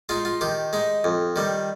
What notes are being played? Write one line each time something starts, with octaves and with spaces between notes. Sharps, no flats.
G#3 D#4 F4
F4
D#3 G4
G#3 D#4
F2
D#3 G3